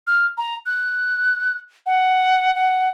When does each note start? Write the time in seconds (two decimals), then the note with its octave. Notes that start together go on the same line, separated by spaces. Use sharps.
0.07 F6
0.38 A#5
0.66 F#6
1.86 F#5
2.55 F#5